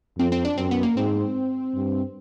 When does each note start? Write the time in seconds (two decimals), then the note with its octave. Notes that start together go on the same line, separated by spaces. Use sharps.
0.18 F2 C4
0.32 C4
0.45 D4
0.57 F#2 C4
0.71 B3
0.83 A#3
0.96 G#2 C4
1.74 G2